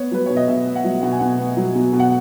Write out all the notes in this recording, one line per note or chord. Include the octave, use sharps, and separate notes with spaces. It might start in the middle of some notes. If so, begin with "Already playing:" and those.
Already playing: B3 C#5
F#3 B4
B2 C#5
D#5
B2 E5
B3
F#5
F#3
B2 F#5
G#5
B2 F#5
B3
F#3
B2
B2
F#5